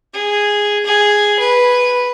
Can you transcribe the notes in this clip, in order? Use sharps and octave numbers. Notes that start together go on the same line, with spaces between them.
G#4
G#4
B4